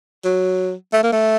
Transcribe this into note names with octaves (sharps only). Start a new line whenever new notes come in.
F#3
A3
A#3
A3